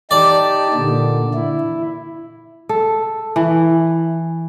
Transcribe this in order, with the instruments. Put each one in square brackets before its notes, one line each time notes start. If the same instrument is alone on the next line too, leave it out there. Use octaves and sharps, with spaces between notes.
[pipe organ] D#4 G4 A5 [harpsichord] D5
[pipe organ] A#2 D3
E4
[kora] A4
E3